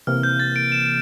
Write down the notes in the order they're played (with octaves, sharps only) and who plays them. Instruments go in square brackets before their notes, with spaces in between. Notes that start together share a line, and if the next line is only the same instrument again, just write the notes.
[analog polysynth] C3 E3 A#3 [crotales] F6
[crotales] G6
A6
D7
E7